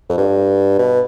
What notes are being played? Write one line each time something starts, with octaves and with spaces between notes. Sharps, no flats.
F2
G2
B2